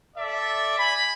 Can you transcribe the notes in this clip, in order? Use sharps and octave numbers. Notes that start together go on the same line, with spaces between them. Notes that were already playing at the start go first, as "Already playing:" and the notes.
A4 D5 E5
G#5 B5